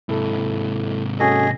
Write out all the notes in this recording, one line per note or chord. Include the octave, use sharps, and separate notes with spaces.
G#2 C3 E4 A4
C#4 F#4 G#4 A4 D#5